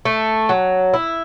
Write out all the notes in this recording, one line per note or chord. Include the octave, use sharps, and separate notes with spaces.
A3
F#3
E4